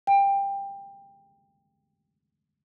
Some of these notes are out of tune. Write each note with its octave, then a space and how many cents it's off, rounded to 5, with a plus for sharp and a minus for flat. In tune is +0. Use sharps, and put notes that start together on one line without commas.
G5 +20